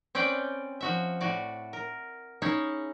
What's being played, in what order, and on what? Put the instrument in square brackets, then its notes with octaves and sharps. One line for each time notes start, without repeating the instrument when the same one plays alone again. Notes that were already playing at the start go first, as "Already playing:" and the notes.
[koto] C4 C#4 B4 D5 G5
F3 F#4 E5
A2 F#4 D5
A#4
C#4 D#4 E4 G#4 C#5